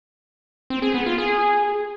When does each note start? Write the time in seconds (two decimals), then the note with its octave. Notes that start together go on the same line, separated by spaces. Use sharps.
0.70 C4
0.82 G#4
0.94 B3
1.06 F4
1.18 G#4